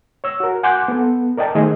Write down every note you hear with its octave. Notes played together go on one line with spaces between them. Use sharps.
C#5 E6
F#4 A#4
F#5 G#5 C6 D6 F#6 G6
B3 A4
A#4 D5 D#5 G5 A5
D#3 A3 G#4 C5 D#5